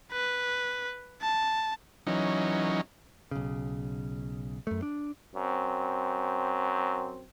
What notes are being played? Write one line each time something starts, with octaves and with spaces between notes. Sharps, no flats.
B4
A5
E3 F#3 C#4 D#4
B1 C#3
F#2 A3
D4
F#2 C4